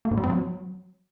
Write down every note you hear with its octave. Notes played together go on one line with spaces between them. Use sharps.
A#3
G#2
G3
C4
F#3